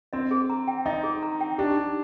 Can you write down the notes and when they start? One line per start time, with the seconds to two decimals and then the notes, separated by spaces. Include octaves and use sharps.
0.13 C4 D#5
0.31 G#4
0.50 A#5
0.68 G5
0.86 D#4 D#5
1.03 G#4
1.23 A#5
1.41 G5
1.58 D4 G4
1.77 D#4